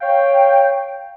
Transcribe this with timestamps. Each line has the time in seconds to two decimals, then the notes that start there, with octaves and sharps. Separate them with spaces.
0.01 C#5 F5 G5